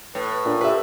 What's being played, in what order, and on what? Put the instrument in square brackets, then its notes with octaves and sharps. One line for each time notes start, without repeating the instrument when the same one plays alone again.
[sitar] A2 [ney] B4
[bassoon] A#2 [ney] D4
[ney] G4 [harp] B4 E5